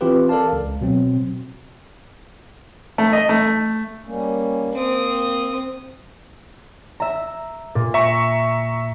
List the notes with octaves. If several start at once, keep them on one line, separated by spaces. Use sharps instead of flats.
E3 C4 F4 G4 B4
A4 A#4 D5 F5 A5
C#2
B2 F#3 C4
A3
D#5
A3
G3 A#3 C#4
A#3 C4 D#6
E5 A#5
A#2
E5 A#5 C#6